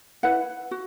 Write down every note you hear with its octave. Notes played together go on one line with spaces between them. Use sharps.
E4 B4 F#5
F#4